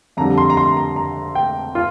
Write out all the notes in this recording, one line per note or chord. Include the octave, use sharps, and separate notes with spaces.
F2 D3 G3 A#5
C6
A#5
C6
A#5
A#5
G5
F4